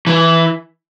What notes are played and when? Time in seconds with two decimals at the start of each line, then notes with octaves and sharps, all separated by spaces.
0.07 E3